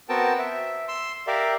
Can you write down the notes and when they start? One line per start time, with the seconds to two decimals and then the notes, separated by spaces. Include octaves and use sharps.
0.09 B3 C4 F#4 A#4 G5 A5
0.39 E5
0.88 C6 E6
1.27 G4 A#4 D5 E5 F5